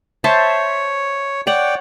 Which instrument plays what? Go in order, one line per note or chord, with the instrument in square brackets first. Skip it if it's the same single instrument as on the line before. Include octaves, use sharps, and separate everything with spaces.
[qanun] C5 E5 A5 [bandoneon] C#5
[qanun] C#5 F#5 [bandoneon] D5 G5